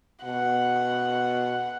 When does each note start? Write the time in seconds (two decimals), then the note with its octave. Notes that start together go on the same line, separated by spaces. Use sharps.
0.25 B2 F#5